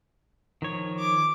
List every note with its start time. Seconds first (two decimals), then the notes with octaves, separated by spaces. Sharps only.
0.62 D#3 F3 C#5
0.99 D6